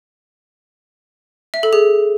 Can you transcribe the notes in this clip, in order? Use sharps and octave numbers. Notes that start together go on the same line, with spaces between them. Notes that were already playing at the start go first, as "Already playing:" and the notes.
E5
A4
G#4